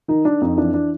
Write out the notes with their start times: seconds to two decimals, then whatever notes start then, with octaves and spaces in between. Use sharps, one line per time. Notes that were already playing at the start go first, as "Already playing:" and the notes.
0.08 D#3 D#4
0.25 D#3 D4
0.41 F2 D#4
0.57 E3 D4
0.74 D4